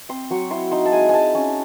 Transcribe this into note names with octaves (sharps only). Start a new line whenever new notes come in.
C4 C6
F#3 C#6
E4 C6
D#4 C6
A5
G#3 G#5
G#3 G#5 A5
C#4